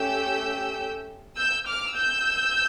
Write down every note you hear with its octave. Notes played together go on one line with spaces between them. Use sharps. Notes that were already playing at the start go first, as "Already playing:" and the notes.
Already playing: A3 C#4 G4 E6 G6
E6 G6
D6 F6
E6 G6